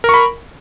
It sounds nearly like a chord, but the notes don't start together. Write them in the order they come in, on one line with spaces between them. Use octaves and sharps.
A#4 C#6 B5